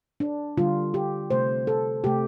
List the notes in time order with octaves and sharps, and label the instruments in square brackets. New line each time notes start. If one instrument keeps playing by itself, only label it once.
[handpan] D4
D3 G3 F4
G4
C3 A3 C5
A4
C3 A3 G4